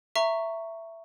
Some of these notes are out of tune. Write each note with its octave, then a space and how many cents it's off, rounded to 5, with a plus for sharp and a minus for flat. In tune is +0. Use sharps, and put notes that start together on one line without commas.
E5 +10 A#5 -15 C#6 +0